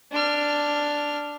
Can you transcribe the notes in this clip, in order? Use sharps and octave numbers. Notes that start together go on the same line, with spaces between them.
D4 F6